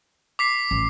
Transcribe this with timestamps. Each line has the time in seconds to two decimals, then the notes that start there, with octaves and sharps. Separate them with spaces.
0.39 D6 B6 C7
0.71 A1